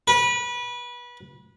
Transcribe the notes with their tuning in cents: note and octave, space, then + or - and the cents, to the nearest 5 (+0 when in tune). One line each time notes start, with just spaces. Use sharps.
B4 -25